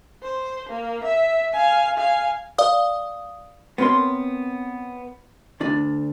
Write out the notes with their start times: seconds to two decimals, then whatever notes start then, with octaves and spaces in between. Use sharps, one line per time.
0.23 C5
0.69 A#3
1.04 E5
1.53 F5 G#5
1.97 F5 G#5
2.58 D5 F5 D#6
3.78 B3 C4 A#4 C#5 C6
5.60 D2 D4 D5